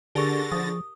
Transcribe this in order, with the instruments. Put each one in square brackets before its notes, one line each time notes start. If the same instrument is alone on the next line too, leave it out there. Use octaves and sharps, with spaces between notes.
[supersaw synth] D3 A6 A#6 [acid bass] D4 [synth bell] G4 A#4 [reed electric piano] G#4 C#6
[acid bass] F3 [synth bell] D#6